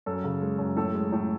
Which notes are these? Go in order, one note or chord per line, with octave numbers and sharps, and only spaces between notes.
F#2 A4
C#3
G#3
F#2
A2 A4
G#3
A2